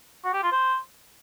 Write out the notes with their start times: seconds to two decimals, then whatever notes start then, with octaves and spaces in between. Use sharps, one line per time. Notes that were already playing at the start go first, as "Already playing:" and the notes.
0.24 F#4
0.33 G4
0.43 F4
0.52 C5